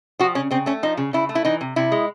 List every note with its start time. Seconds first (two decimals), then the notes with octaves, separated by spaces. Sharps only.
0.19 F3 F#4
0.35 C#3 C#4
0.51 C#3 C4
0.66 A3 C#4
0.83 F3 D#4
0.97 C#3
1.13 C#3 E4
1.29 A3
1.35 E4
1.45 E3 D#4
1.61 C3
1.76 C3 E4
1.92 G#3